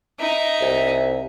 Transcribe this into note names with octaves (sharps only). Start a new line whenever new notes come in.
D#4 E5
C2